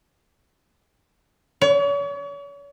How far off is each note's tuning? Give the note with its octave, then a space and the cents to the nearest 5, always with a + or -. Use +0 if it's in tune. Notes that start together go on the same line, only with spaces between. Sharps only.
C#5 +40